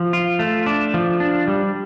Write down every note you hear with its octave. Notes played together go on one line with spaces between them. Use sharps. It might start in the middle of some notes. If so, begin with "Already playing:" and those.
Already playing: F3
F4
A3
D4
F3
D4
G3